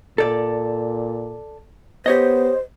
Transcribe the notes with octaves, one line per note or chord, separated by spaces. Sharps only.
A#2 A4 D5
B3 G4 C5 C#5 D#5